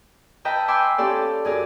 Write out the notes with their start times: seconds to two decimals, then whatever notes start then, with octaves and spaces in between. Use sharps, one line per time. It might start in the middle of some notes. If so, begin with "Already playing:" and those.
0.45 B4 D#5 E5 G5 A5 A#5
0.68 G5 G#5 B5 C6 D6 E6
0.98 C#4 G4 A4 D5 F5
1.45 F#2 G#4 A#4 D5